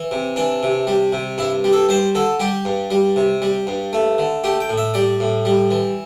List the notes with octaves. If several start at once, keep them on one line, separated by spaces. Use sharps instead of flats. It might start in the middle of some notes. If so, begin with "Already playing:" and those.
Already playing: E3
C3
E3 D4
C3
G3
C3
G2 E4
G3
A4
G3 C5
D3 A4
G3 G4
G2
G3
C3
G3
G2
A3
D3
A3 G4
G5
A2
E5
G3 D5
A2
G3
E3